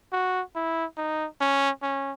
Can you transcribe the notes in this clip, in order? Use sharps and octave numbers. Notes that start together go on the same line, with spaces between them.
F#4
E4
D#4
C#4
C#4